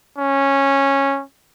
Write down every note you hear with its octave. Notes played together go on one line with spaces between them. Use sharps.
C#4